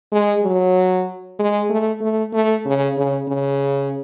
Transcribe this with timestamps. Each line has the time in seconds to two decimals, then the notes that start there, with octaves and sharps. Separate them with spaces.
0.12 G#3
0.43 F#3
1.39 G#3
1.70 A3
2.01 A3
2.33 A3
2.66 C#3
2.97 C#3
3.28 C#3